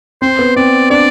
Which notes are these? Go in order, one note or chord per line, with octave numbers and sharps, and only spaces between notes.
C4 C5
B3
C4 D5
D4 D5